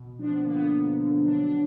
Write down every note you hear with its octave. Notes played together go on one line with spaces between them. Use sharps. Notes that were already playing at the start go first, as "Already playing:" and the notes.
Already playing: B2
F3 D4
B3
D3 A#3
B3
D3
D3
F#3 D4
D4
F#3